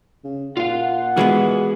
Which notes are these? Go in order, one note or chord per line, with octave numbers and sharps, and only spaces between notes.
C#3
A#2 F4 F5 F#5
E3 G#3 B3 F#4 G#4 B4